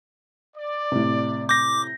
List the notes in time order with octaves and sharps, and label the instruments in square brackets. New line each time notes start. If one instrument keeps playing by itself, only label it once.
[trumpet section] D5
[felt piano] A2 C3
[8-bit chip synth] D6 [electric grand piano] G6 A#6